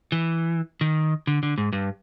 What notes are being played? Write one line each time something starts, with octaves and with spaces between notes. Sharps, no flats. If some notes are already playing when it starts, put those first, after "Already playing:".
E3
D#3
D3
D3
G#2
G2